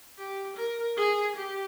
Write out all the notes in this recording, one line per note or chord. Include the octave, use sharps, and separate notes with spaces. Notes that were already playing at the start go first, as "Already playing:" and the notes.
G4
A#4
G#4
G4